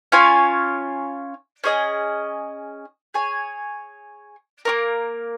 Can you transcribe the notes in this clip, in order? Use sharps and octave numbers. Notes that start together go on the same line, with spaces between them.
C#4 F4 C#5 G#5
C#4 G#4 D#5
G#4 C#5 G#5
A#3 C#4 A#4